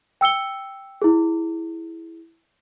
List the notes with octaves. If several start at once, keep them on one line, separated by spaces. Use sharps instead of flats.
G5 E6 C#7 G7
E4 G#4